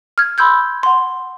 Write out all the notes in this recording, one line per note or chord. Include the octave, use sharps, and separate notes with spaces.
F6 G#6
B5 C6 E6 G6 G#6
F#5 C6